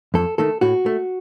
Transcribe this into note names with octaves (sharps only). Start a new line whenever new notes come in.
F2 A4
D#3 A3 A4
A2 F#4
A3